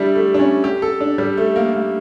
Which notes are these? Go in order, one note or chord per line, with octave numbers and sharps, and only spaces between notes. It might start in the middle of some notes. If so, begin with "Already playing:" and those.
Already playing: G3 D4 E4
A3
D4
C#4
G4
A4
D4
G3
A3
A#3
A#3